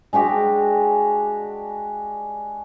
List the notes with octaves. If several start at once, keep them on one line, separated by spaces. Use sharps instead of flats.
G#3 D4 F#4 G4